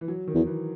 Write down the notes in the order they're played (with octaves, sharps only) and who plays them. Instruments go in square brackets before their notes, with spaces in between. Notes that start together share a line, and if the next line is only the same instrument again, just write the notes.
[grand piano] E3
F#3
D#3
[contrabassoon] E2
[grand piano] E3